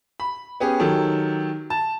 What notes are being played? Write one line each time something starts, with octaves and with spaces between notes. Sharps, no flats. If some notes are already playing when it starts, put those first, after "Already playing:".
B5
B3 C#4 G4 G#4
D#3 F#3 G4 A4
A5